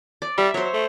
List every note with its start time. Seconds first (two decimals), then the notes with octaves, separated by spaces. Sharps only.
0.22 D5
0.38 G3 E5
0.54 F#3 C5 C#5
0.73 A3